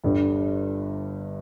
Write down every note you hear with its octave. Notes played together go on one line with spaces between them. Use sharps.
G1 G2 D3 G3